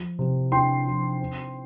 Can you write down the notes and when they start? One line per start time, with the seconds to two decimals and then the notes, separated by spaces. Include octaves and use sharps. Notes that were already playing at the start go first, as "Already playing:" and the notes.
Already playing: F3
0.19 C3
0.52 D4 G5 C6
0.86 F3
1.20 C4